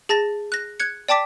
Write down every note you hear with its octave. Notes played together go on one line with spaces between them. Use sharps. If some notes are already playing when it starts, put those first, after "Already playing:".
G#4 A5 A6 A#6
F#6 A#6
F#6 G#6 C#7
D5 G5 A5 D6 B6